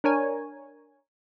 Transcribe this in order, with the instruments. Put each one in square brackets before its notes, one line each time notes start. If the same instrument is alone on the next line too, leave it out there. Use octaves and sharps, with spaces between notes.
[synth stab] D4 A#4 C#5 G#5